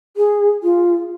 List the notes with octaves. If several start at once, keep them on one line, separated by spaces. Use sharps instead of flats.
G#4
F4